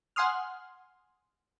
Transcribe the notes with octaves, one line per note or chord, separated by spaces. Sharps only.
F#5 G#5 C6 D#6 F6